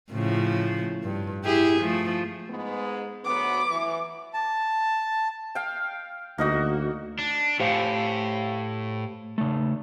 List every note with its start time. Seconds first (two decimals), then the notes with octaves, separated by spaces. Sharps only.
0.11 A2 C#3 F3
1.03 G2
1.44 E4 G4 G#4
1.80 F3 A3
2.49 G#2 G#3 B3
3.25 D2 F#3 B3 D6
3.69 E3
4.34 A5
5.55 F5 G5
6.38 D2 A#3 D#4 F#4
7.19 D4
7.60 A2 G4 C5 F5
9.38 C#3 A3